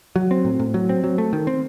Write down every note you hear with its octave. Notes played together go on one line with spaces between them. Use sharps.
F#3
C4
A2
A2
F#3
C4
F#3
A3
D#3
C4